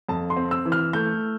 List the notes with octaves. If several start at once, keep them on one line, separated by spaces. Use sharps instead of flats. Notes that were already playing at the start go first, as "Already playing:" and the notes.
F2 A5
C6
C4
E6
E3
F6
A3 G6